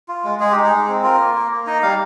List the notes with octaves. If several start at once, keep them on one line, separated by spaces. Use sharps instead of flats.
F4
G#3
G#3 G#4
D#4 G4
G#4
G#3
C4
F4 A#4
A#3
A#3
A#3
D#4 D#5
G3 F5